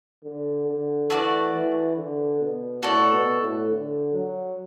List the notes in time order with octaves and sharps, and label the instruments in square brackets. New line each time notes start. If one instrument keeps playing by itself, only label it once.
[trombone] D3
D3
[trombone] E3 [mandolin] A3 F#4 B4 D5
[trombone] E3
D3
B2
[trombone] A2 [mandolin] F#4 A4 D5
[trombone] B2
A2
D3
F#3